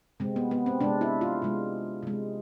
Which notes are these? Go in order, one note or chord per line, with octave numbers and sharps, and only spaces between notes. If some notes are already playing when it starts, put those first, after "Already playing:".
C3 G#3 C4
B3
B3
C4
C3 G#3 D4
E4
F4
C3 G#3
C3 G#3